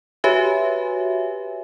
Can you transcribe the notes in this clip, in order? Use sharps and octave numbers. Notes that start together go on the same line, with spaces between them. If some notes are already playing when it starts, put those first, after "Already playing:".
F#4 G4 B4 C#5 E5 G#5